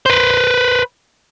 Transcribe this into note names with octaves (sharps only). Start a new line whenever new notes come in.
B4 C5